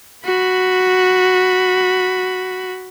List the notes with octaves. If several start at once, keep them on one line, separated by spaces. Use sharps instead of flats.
F#4 B5